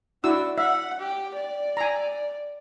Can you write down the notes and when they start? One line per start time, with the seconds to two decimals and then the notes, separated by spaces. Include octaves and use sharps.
0.24 D4 E4 F#4 E6
0.58 E5 F#5
0.99 G4
1.34 D5
1.77 G#5 A#5